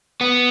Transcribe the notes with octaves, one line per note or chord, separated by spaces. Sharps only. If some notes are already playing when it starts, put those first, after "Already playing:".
B3